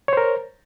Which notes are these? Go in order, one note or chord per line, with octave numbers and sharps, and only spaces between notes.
A#4 C5 C#5